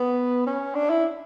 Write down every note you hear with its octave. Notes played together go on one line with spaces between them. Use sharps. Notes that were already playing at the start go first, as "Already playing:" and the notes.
Already playing: B3
C#4
D4
E4